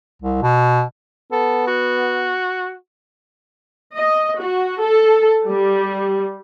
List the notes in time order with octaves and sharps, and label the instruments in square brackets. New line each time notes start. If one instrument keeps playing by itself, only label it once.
[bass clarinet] C2
B2
[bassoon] B3 [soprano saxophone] A4
[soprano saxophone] F#4
[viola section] D#5
F#4
A4
G3